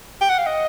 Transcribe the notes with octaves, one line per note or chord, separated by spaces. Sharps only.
G5
F#5
F5
D#5